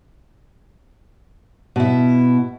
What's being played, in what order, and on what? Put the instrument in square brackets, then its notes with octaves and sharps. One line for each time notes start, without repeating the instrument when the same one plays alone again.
[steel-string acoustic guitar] B2 E4